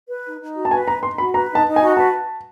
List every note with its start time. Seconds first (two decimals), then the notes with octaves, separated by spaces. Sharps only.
0.09 B4
0.24 D#4
0.39 D#4
0.55 F#4
0.65 A5
0.71 B4 G#5
0.87 D#4 A#5
1.03 D#4 C6
1.18 F#4 B5
1.34 B4 A#5
1.50 D#4
1.55 A5
1.66 D#4
1.76 G#5
1.82 F#4
1.97 B4 A5